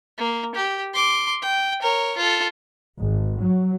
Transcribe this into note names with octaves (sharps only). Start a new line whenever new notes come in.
A#3
G4
C6 D6
G5
A#4 C#5
F4 A4
G#1
F#3